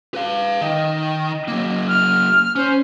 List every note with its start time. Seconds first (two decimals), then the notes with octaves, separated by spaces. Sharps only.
0.15 B4 F5
0.61 D#3 D#5
1.48 F#3 A#3
1.87 F6
2.56 C#4 C5